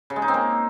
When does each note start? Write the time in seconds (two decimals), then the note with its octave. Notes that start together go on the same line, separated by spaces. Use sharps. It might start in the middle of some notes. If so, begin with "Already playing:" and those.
0.10 C#3
0.16 G#3
0.22 D#4
0.28 C4
0.34 A#3